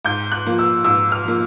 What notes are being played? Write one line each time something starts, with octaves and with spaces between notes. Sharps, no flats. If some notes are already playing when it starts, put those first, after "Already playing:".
G#2 G6
F#6
F3 A#3
E6
G#2 E6
F6
F3 A#3